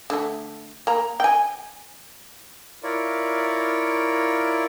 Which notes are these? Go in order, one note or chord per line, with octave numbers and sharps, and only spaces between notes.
D3 A3
A#3 A#5
G5 G#5
E4 F4 A#4 C#5 D5